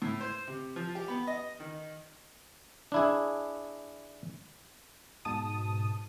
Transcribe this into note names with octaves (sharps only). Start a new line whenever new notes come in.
A2
C5
C3
F3
G4
B3
D#5
D#3
D4 E4 G#4
G#2 B2 A5 D#6 D#7